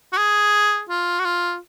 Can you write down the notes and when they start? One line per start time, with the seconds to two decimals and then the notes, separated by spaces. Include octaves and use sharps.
0.13 F#4
0.17 G#4
0.89 F4
1.19 F#4
1.25 F4